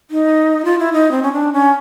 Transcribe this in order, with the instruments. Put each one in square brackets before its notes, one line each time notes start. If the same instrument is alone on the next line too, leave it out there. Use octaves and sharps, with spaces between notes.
[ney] D#4
F4
E4
D#4
C4
C#4
D4
C#4